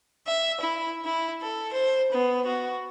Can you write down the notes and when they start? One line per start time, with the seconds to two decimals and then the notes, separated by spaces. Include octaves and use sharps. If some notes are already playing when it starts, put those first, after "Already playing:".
0.27 E5
0.60 E4
1.05 E4
1.42 A4
1.73 C5
2.12 B3
2.46 F#4